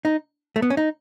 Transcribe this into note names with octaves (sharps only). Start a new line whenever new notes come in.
D#4
A3
B3
C#4
D#4